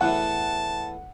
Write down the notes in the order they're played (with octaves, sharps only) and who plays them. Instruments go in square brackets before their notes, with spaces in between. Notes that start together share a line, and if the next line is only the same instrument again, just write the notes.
[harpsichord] E2 A2 E3 [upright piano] F#5 [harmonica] A5